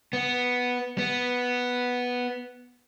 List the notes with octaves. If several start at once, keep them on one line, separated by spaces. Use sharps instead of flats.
B3
B3